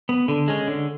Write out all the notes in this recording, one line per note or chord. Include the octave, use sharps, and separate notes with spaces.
B3
D3
G#3 C#4
D3